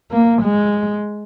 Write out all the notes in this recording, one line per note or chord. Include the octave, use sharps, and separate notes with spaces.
A#3
G#3